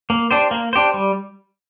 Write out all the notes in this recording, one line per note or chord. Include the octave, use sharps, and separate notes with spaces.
A#3
D4 G4 C5
A#3
D4 G4 C5
G3